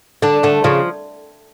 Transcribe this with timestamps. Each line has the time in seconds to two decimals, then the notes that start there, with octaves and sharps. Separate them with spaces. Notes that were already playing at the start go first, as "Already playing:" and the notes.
0.22 D3 D4
0.43 D3 A3
0.64 C#3 F3